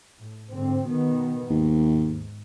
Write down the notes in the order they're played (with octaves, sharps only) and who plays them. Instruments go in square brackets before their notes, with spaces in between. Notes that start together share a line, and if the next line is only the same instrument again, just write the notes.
[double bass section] A2
G#2 D3 C4
B2 D#3 B3
[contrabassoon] D#2 [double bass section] G#2